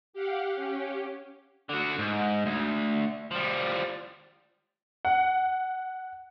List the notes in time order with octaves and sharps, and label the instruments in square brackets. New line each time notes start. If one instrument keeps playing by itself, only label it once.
[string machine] G4 F5 F#5
C#4 G4
[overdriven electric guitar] D3 F#4
G#2
D2
F3 G3
[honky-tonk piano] F#5